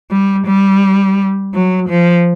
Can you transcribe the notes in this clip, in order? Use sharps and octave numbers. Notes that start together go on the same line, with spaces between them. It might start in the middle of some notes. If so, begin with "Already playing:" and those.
G3
G3
F#3
F3